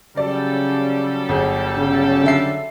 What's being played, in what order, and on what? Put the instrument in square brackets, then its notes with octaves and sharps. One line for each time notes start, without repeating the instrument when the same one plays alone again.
[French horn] C#3 [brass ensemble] F#3 G3 A4 [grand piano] D5
[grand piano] G1 G#4
[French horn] C#3
[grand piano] D3 E5 C7